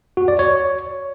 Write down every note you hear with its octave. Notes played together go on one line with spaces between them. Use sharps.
F#4
D5
C#5